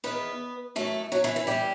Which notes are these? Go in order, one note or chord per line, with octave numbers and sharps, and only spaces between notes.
E2 D#3 B3 B4
F#2 E3 A3 A4
F#3 F#4
E3 E4
E3 E4
G2 E3 G3 G4